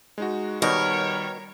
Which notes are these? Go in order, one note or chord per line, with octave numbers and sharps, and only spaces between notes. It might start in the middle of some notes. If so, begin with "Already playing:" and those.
G#3 D#4 F#4
B2 D#3 G3 A#4 C#5